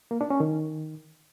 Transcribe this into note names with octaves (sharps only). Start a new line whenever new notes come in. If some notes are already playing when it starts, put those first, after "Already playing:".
A#3
D4
C#4
D#3